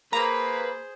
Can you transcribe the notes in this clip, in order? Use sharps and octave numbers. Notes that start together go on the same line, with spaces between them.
A#3 G#4 B4 C5 A#5